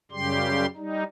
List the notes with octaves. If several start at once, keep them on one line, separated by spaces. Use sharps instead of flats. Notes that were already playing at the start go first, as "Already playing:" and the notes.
F#2 C#3 G3 G4 C6
G3 D#4